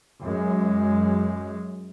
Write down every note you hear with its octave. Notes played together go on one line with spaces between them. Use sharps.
F#2 G#3